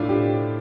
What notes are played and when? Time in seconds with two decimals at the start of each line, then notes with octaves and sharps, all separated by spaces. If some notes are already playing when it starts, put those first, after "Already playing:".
Already playing: A2 D4 E4 F4 D5 E5 F5
0.09 G4